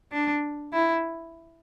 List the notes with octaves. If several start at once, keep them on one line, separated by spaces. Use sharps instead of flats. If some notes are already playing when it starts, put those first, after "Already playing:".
D4
E4